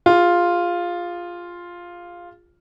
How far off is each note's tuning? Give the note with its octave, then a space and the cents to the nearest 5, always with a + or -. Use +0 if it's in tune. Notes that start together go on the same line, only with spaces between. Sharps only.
F4 +0 G#4 -30